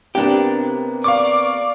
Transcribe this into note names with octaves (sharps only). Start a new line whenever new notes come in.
C3 A#3 B3 D4 G4
D5 F5 C#6 D6